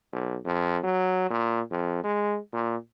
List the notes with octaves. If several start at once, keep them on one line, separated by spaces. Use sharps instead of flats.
B1
F2
F#3
A#2
F2
G#3
A#2